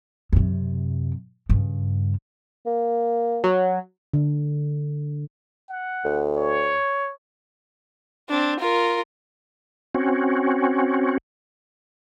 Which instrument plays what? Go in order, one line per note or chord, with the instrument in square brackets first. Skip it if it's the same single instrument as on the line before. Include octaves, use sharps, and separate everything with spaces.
[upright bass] F#2 C3
G2 C#3
[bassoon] A#3
[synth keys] F#3
[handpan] D3
[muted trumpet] F#5
[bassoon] D2
[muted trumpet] C#5
[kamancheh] C4 D4
F4 A#4
[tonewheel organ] C4 C#4 F#4